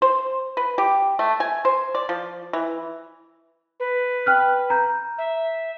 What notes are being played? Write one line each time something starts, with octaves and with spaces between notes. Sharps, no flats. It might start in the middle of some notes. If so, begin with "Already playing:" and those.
C5
B4
G4
A3
G#5
C5
D5
F3
E3
B4
G5 F6 F#6
A#5 G6
E5